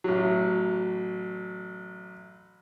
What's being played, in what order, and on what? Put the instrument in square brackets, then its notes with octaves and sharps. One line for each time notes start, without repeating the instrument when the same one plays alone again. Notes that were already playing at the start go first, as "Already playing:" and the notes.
[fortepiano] A1 F#3